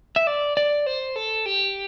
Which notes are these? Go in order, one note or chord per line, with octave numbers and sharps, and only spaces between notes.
E5
D5
D5
C5
A4
G4